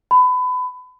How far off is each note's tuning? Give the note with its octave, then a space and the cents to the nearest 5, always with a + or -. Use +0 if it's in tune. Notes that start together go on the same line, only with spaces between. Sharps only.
B5 +25